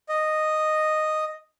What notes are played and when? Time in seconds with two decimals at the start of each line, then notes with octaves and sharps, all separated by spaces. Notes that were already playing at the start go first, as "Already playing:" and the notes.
0.09 D#5